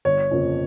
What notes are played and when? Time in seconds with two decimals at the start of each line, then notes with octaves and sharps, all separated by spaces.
0.05 G1 C#5
0.31 F2 C#3 F3 A#3